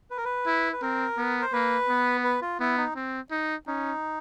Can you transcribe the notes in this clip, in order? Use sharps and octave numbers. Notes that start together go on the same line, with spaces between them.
B4
A#4
B4
E4
B4
C4 A#4
B3
C5
A#3 B4
B3
B4
F4
B3 E4
D#4
C4
D#4
C#4 D#4